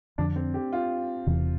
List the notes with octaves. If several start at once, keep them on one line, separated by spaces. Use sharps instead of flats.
F2 D3 F3 D4
C4
G4
F4
E1 E2 C3 E3